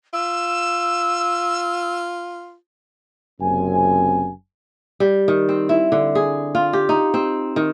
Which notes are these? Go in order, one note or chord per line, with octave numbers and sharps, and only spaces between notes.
F4 E6
F#1 F#2 C3 C4 G#5
G3
D#3
C4
E4
D3
G#4
F4
G4
D#4
C4
D#3